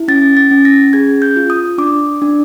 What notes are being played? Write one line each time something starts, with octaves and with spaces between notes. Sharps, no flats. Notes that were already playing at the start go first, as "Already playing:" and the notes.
Already playing: E4
C#4 A6
A6
C#4
A#6
G#4 G#6
G6
F4
D#6
D4 D6
D4